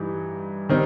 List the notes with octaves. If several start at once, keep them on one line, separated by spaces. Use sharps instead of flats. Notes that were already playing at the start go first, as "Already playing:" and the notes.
Already playing: G2 E3 G3 D#4
D#3 G3 C4 D#4